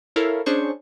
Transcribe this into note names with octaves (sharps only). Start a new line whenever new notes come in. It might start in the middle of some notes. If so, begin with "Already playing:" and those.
E4 A4 A#4 C#5 E5 F5
C#4 D4 G#4 C5 C#6